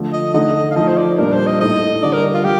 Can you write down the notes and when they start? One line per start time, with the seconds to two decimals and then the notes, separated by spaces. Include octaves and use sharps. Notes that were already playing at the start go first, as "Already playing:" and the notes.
Already playing: D3 F3 A3
0.13 D#5
0.34 D3 A3 D#4 D#5
0.71 F5
0.76 F3 A3 D#4 D#5
0.88 C5
0.97 D5
1.18 A#2 G3 D4 A#4
1.32 C5
1.47 D#5
1.61 A2 A3 D#4 D#5
2.03 D3 G3 D4 D5
2.13 A#4
2.34 F4
2.44 G3 G4